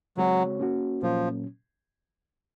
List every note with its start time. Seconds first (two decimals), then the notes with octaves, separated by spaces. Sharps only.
0.17 C#3 F#3 G#3 C4 F#4 C#5
0.60 A#3 C#4 F#4
1.03 A#2 F3 F#3 A#3 C#4